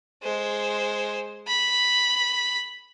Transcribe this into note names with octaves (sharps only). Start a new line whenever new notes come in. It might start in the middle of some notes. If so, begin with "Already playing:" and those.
G#3 C5
B5